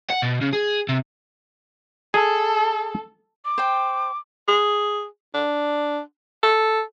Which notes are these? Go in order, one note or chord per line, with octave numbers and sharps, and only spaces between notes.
F#5
B2
C#3
G#4
C3
G#4 A4
D6
C5 G5
G#4
D4
A4